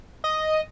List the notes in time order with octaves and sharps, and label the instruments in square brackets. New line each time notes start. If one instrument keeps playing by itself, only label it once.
[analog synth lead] D#5